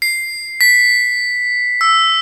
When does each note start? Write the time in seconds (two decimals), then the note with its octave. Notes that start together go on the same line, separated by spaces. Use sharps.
0.02 C7
0.61 B6
1.81 E6